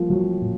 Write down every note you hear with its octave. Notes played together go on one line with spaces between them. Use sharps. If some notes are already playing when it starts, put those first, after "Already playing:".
Already playing: F3 G3 A#3 F4
F#3 F#4
A#2